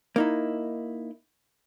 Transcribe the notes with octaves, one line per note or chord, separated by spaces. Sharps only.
A#3 D#4 E4